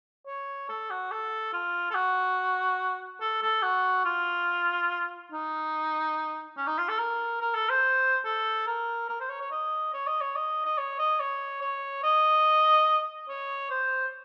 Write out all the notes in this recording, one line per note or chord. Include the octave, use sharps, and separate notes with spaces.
C#5
A4
F#4
A4
F4
A4
F#4
A4
A4
F#4
F4
D#4
C#4
D#4
F4
A4
A#4
A#4
A4
C5
A4
A#4
A#4
C5
C#5
C#5
D#5
C#5
D#5
C#5
D#5
D#5
C#5
D#5
C#5
C#5
D#5
C#5
C5